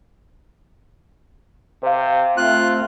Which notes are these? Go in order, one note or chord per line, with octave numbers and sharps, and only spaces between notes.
C3 C5 F5
A3 C4 F4 F#6